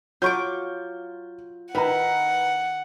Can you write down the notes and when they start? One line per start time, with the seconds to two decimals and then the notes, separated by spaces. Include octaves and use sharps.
0.22 F#3 F4 C#6 D6 G6
1.75 D#3 E4 B4 F#5 A#5